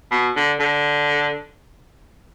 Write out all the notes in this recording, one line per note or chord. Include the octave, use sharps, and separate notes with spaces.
B2
D3
D3